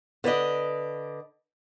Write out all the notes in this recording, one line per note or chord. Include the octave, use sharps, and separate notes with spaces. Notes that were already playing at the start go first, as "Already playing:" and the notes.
D3 B4 D5 D#5